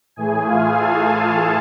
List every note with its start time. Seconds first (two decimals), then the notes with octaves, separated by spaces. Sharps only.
0.16 A2 E3 A3 G#4 G#5
0.47 F4 F5
0.77 A4 A5
1.08 A4 A5